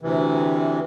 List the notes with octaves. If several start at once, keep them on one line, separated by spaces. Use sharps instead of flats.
D2 C3 E3